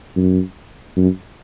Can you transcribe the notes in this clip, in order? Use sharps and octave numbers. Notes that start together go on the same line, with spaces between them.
F#2
F#2